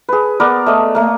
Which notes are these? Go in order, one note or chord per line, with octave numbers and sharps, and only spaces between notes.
G#4 B4
B3 A#4 D5
A3 D5 D#5
A3 A#3